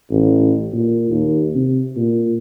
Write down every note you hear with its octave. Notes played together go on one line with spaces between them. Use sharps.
A1
A#2
D#2
C3
A#2